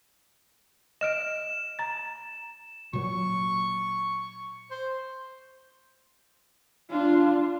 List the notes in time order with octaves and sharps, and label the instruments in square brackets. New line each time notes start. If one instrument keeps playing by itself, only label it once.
[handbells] D#5 F6 D7 [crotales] E7
[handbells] A#5 A6
[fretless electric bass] A#2 F#3 [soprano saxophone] C#6
[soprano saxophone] C5
[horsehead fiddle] D4 F4